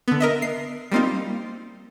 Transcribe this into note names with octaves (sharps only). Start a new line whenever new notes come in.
D3 B3
A#4 D#5 E5
C7
G3 A#3 C4 D#4 F4